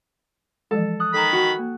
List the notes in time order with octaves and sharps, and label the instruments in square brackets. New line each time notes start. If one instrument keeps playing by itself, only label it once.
[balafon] E3 F3 G#3 [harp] A4
[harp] D#6 F#6
[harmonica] D#3 B5 [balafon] A4 A#5
[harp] F#4
[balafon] A#3